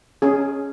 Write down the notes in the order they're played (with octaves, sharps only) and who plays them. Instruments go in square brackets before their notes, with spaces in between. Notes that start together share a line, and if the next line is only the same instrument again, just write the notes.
[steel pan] C#4 G#4